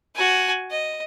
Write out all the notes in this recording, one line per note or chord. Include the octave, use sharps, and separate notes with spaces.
F#4 G#5
D#5